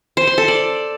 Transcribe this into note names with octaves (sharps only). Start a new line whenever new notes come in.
C5
C6
A4
D5